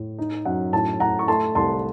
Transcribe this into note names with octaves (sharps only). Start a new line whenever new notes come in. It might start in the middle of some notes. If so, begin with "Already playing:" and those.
Already playing: A2
D#4
F#2 F#5
A2 A5
A2 F#5 A#5
C#6
A3 A5 C6
C2 A5 C6